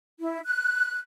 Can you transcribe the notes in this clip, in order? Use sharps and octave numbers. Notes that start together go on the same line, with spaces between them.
E4
F#6